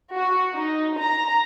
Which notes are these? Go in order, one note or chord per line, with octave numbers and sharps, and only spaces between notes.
F#4
D#4
A#5